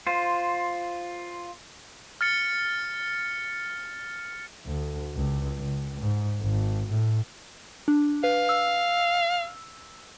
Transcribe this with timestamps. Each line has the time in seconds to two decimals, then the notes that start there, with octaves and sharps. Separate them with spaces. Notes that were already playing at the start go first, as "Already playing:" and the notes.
0.07 F4 C5
2.21 F6 A6 C#7
4.66 D2
5.16 C#2
5.59 C#2
6.01 G#2
6.41 G#1
6.90 A2
7.88 D4
8.24 B4 F5
8.49 E6